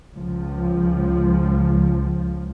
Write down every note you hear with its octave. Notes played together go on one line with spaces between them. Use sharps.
C#2 F3